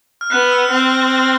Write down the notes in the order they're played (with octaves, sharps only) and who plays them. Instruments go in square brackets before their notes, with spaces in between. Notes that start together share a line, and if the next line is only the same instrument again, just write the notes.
[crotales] F6
[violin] B3 [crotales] F#6
[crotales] E6
F6
[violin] C4
[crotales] E6
F6
E6
F6